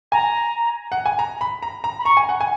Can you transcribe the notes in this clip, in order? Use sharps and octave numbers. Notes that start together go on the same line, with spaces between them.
G#5 A#5
F#5
G#5
A#5
B5
A#5
A#5
B5
A#5 C#6
G#5
F#5
G#5